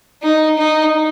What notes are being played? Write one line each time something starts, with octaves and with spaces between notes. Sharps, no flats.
D#4
D#4